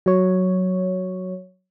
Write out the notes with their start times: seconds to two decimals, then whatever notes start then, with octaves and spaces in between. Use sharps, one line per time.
0.06 F#3 C#5